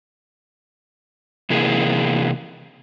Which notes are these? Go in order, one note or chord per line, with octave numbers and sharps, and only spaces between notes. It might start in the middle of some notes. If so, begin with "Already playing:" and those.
C3 E3 A#3 G#4